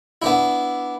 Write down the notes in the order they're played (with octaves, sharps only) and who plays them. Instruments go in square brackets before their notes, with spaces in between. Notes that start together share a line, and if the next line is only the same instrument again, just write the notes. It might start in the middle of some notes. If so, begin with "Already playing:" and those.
[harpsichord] B3 D4 E4